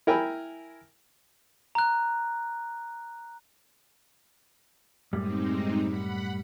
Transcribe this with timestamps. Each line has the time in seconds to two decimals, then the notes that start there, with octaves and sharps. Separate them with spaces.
0.07 E4 A#4 G5 G#5 B5
1.75 A#5 F#6
5.13 F#2 A2 G3 G#3 C4 D#4
5.81 F#5 B5